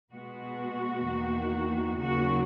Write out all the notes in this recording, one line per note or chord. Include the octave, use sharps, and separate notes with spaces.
B2 G#3 B3 F#4
E2 D#3 A#3
D#2 C#3 F#3 A#3 F#4